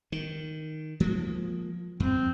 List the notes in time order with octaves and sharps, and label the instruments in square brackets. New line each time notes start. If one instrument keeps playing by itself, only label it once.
[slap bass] D#3
F3 G#3 A#3
[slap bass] F2 [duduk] C4